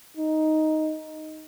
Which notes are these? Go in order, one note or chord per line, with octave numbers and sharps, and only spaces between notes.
D#4